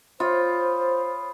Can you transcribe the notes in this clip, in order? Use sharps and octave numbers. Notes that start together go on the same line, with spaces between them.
F4 C5 C#5 B5 D#6